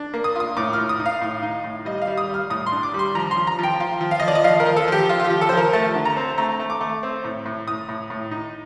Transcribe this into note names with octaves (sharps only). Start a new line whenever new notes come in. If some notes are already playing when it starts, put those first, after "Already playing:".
Already playing: D4
A#3
D#6
F4 D#6
A2 D6
A2 F6
D#6
D#4
F5
A2
D#4
A2
G3 D#5
F5
G3
D#6
G3
F6
A2 D#6
C6
D4
D6
G3
C6
F3 A#5
C6
F3
A#5
F3 G5
F4
F3
F5
F3 D#5
D5
D#5
F3 F5
A#4
F3
A4
F3 G4
F4
F4
G4
F3
A4
F3 C5
A#4
A3 A5
D3
A#5
C4
A3 A#5
A3
D6
A3
C4
A2
A2
A2 D#6
A2
A2
D#4